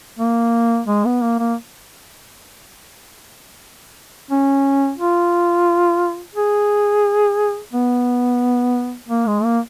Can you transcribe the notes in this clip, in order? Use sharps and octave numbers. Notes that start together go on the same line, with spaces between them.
A#3
G#3
B3
A#3
A#3
C#4
F4
G#4
B3
A#3
G#3
A#3